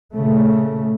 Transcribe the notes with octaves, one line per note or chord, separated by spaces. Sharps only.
A#2 C#3 A3